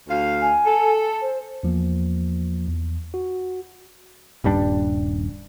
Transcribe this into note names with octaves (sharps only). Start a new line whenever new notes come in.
D2 F5
G#5
A4
C5
E2 F3 A#3
E2
F#4
D#1 G2 G3 D4